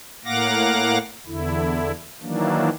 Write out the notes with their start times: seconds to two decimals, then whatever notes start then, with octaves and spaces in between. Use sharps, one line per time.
0.25 A2 A#3 F5 F#5 D6 A#6
1.27 E2 D3 E4
2.22 D#3 E3 F#3 A#3 D4